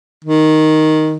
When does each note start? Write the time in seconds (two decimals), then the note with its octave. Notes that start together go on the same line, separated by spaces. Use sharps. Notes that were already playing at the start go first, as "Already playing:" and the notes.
0.24 D#3